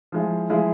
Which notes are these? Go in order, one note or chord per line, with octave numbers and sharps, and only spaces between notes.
F3 G#3 E4
F3 G#3 E4